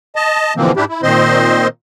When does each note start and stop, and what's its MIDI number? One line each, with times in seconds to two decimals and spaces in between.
0.16 0.53 75
0.16 0.53 81
0.57 0.72 47
0.57 0.72 50
0.57 0.72 52
0.57 0.72 53
0.57 0.72 58
0.57 0.72 60
0.77 0.85 44
0.77 0.85 62
0.77 0.85 64
0.77 0.85 67
0.89 1.01 64
1.03 1.67 46
1.03 1.67 51
1.03 1.67 60
1.03 1.67 72
1.03 1.67 75
1.03 1.67 84